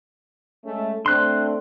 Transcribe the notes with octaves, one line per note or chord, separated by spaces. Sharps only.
G#3 A3 C#4
A3 C4 D4 C6 F#6